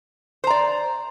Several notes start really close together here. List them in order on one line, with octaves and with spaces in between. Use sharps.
C5 A#5 D5